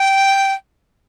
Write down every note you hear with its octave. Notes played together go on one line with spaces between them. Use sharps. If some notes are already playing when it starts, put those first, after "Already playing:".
Already playing: G5